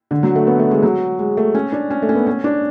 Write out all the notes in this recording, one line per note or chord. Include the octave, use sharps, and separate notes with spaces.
D3
F#3
A3
B3
A3
G#3
F#3
G#3
A3
C#4
D4
C#4
A3
C#4
B3
C#4
D4